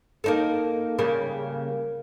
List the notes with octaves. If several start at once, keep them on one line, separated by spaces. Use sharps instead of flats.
A#3 D#4 A4
C#3 G3 A#3